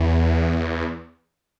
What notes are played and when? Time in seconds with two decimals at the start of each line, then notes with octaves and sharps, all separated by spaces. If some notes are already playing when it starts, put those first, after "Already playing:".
Already playing: E2